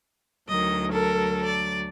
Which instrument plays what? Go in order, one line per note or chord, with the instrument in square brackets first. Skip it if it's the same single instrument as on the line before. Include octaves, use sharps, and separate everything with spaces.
[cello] D2 F#3 [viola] D#3 D#5
[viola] A4 A#4
D5